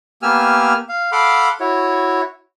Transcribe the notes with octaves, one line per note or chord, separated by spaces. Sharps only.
A#3 B3 G4 G#5 E6 F6
F5
A4 F5 F#5 B5 C6 D6
E4 F#4 C#5